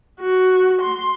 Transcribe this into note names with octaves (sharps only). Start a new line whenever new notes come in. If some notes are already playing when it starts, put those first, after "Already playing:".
F#4
C6